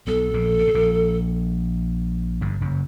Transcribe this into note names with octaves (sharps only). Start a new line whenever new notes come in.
B1 B2 A4
A#1 A#2
A#2
A2
A#1 A#2
G1 G2
F#1 F#2